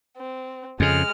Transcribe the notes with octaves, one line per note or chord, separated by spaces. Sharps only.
C4
F2 C#3 G#3 F6